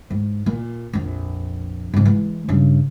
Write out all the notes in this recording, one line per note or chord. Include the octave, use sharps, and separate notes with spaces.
G#2
A#2
A#1 F2
G#2 C3
E3 G#3
G2 C#3